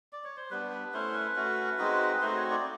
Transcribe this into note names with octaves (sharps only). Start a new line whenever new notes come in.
D5
C#5
C5
G3 B3 D4 B4
B4
A3 C#4 E4 C5
B4
A3 C#4 F#4
G#3 C4 D#4 F#4
A3 C4 D#4 F#4 C5
C#5
D5